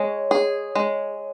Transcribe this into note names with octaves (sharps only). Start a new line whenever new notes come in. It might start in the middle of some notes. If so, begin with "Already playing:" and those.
Already playing: G#3 C#5
G#4
G#3